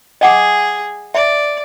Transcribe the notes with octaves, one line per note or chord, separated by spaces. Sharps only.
G#4 D#5 F#5 D6
D5 E5